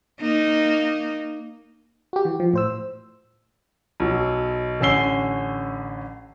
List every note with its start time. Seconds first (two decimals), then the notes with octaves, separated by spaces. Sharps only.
0.21 A#3 D#4
2.13 F#4 G4
2.25 E3
2.40 F3
2.54 A2 C5 E6
4.00 B1 F#3
4.80 A1 D3 C#4 E6 C7 G7